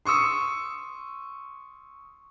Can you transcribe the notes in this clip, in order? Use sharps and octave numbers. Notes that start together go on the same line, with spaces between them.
C6 C#6 D#6 E6 C#7